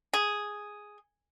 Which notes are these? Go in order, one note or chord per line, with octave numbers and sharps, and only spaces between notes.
G#4